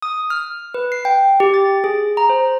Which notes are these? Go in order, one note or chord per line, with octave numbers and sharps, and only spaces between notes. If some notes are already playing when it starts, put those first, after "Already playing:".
D#6
F6
B4
C7
G5
G4
A6
G#4
A#5
C5